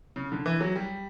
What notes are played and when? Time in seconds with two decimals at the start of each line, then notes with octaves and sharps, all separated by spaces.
0.16 C#3
0.32 D3
0.46 E3
0.61 F#3
0.76 G3